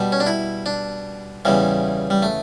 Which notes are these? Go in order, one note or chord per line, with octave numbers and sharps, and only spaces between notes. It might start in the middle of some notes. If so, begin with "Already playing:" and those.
Already playing: B2 G3
C#4
D4
E4
D4
E2 C#3 E3 G3
G3
A3